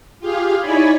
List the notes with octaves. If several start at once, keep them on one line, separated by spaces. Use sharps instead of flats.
F4 G4 G#4 F5
D#4 E4 C#5 D5 G#5 B5